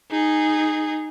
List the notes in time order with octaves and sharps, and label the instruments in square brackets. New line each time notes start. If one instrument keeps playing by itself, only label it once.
[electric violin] D#4 G#4